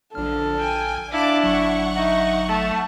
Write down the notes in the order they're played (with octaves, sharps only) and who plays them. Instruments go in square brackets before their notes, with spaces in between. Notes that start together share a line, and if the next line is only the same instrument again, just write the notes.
[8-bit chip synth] A#1 F6 [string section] D3 F3 D4 [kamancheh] A4
[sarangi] G5 [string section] G#5
[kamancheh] D4 [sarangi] E4 [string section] F5 A5 D6
[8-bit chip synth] G1 F#3 [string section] F#5 C#6
[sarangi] D#4 [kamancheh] E5
[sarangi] A3 [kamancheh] A5